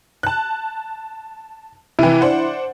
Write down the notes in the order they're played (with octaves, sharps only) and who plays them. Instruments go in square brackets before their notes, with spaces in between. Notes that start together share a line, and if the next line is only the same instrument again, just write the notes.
[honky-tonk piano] A5 F#6
[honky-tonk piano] C3 E3 [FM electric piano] E4
[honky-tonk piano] D4 C5 F#5